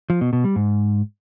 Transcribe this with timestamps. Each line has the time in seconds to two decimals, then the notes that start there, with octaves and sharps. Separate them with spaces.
0.10 F3
0.21 B2
0.33 B2
0.44 G3
0.56 G#2